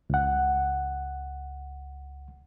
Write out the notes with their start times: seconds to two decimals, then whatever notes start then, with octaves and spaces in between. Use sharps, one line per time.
0.10 C#2 F#5